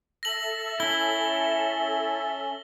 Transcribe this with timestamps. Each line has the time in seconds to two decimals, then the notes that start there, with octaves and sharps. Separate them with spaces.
0.23 A4 E5 A#6 F#7
0.80 C#4 E4 G7